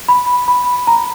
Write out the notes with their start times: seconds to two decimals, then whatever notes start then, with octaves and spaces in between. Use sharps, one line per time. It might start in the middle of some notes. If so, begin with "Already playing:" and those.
0.09 B5
0.48 B5
0.87 A#5